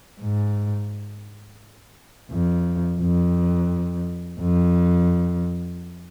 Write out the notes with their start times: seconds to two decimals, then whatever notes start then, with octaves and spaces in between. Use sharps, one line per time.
0.21 G#2
2.31 F2
3.01 F2
4.40 F2